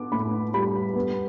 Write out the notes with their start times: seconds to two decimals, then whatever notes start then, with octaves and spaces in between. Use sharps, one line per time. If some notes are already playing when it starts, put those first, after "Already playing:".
Already playing: B3 D6
0.12 A2 B5
0.54 G3 B5
0.95 B3